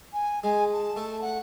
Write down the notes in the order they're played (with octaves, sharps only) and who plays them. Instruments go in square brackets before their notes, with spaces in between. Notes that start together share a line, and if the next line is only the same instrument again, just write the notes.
[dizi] G#5
[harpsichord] G#3 [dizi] G#5
[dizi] A5
[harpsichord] A3
[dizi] F#5